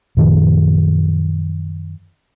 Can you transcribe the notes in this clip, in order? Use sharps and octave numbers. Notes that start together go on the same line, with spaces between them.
F#2 A#2 D#3 F3